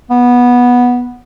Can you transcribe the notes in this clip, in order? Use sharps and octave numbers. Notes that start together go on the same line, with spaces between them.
B3